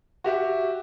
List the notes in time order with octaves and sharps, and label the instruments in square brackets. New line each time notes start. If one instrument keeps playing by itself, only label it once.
[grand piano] F#4 G4 E5